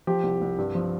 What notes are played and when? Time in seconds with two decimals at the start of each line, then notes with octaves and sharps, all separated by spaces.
0.07 F3 G4
0.23 C2
0.41 C2
0.58 G2
0.75 F3